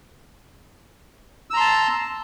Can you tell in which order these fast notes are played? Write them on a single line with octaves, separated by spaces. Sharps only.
E6 A#5 C6 A5